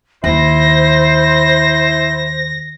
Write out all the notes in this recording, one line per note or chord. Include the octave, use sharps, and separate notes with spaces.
D#2 E4 C5 A#6